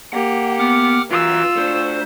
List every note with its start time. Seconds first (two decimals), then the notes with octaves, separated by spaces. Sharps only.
0.13 A#3 G4 F#5
0.59 B3 F#5 D6 F6
1.10 F#2 E3 F4 E6
1.56 A3 D4 C5